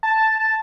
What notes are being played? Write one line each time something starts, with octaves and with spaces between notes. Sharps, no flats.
A5